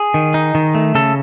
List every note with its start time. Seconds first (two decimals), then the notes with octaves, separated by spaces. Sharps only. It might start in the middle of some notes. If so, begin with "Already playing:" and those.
Already playing: G#4
0.14 D#3
0.34 D#4
0.55 D#3
0.75 A3
0.95 C#3 A4